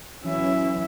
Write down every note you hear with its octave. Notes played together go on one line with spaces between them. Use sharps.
E3 F#3 C#4 E4 E5